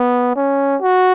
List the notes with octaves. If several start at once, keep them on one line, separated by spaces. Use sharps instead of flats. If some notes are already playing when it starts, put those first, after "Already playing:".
Already playing: B3
C#4
F#4